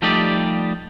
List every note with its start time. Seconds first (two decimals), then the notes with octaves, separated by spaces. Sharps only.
0.02 F3 G3 A3 D#4 G4 D5